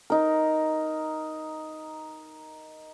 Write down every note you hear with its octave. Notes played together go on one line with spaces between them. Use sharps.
D#4 A#4